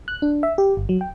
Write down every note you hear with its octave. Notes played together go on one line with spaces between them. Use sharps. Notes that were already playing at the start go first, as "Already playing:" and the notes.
F#6
D4
E5
G4
G1
F#3
G5